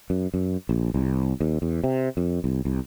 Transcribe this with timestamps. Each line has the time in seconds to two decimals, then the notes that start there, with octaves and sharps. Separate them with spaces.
0.10 F#2
0.34 F#2
0.69 A#1
0.94 C2
1.41 D#2
1.62 E2
1.84 C3
2.17 F2
2.44 C2
2.65 C2